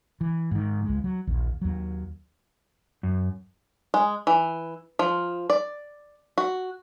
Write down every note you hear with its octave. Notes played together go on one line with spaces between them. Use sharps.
E3
G#2 D#3
C#2 G#3
F#3
A#1 D#2
D#2 F#3
F#2
G#3
E3
F3
D5
F#4